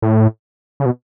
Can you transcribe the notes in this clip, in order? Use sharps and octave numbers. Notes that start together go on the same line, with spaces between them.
A2
C#3
B2